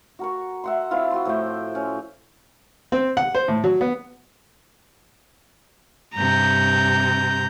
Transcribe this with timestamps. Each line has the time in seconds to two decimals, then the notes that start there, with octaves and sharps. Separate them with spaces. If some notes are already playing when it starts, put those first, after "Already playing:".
0.19 F#4 A#4 C#6
0.64 E5 F#5 C6
0.91 C4 E4 F4 F5
1.11 F#4 C6
1.25 A2 F3 E5 G5
1.75 C#4
2.92 C4
3.17 F#5
3.35 C5
3.48 A2
3.64 F#3
3.81 B3
6.16 G2 C3 A#5 G6